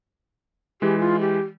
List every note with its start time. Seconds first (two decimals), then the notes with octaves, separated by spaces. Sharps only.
0.82 E3 G#3 G4
0.99 F4
1.20 G4